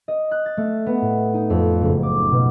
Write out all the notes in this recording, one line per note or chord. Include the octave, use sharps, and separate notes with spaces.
D#5
F#6
A6
A3
B3
A2
D#4
F2
F#1
D6
B2